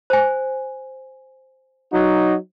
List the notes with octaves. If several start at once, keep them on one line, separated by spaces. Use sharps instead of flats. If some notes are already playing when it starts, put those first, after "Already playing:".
C5 G#5
F#3 D#4 F#4